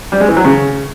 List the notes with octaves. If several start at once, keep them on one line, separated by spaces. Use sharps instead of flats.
G3
G#3
E3
F#3
C#3